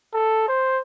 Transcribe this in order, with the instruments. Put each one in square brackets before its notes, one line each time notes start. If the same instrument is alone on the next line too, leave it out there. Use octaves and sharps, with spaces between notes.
[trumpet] A4
C5